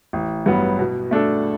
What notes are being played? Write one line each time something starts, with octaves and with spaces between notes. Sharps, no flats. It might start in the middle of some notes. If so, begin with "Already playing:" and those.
A1
G2 F#3 B3
B2
A3 D4 A4